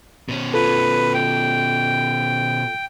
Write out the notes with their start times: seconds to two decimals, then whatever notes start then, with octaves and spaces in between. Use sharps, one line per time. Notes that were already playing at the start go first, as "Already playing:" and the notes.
0.29 B2 C#4
0.54 F4 A4 B4
1.14 G5